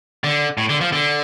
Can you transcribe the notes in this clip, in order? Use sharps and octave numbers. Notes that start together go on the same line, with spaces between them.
D3
A2
D3
F3
D3